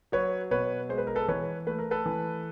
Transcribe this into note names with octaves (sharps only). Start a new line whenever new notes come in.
F#3 B4 C#5
B2 B4 C#5
G#3 C5
B4
A#4
A4 B4
E3 B4 C#5
A3 B4
A#4
A4 B4
E3